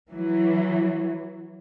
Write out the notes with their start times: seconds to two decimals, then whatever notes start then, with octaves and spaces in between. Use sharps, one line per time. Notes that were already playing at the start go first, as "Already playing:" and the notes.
0.11 E3 F#3